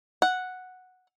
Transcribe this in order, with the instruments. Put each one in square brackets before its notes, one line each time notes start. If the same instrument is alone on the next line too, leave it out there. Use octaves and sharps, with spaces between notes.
[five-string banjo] F#5